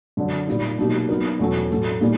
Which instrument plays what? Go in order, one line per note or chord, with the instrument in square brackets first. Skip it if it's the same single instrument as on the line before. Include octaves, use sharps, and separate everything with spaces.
[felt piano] F#2 D3 F#3
A#2 G3 A#3 D#4
B2 F#3 A#3 D#4 G4
F#3 B3 D#4 F#4 A#4
E2 B2 F#3 A3 C#4
A2 F#3 A3
A#2 G3 A#3 D#4 G#4